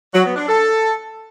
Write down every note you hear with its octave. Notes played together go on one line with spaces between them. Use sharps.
F#3
B3
D4
A4